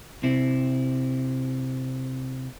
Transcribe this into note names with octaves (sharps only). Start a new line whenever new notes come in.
C3 C4 E4